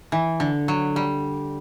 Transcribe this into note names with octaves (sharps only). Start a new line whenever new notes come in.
E3
D3
F#3
G3